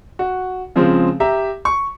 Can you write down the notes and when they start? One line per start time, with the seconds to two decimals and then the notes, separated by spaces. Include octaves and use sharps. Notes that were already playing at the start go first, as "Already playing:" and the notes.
0.19 F#4
0.76 C#3 F3 G#3 C4
1.20 G4 E5 A#5
1.65 C#6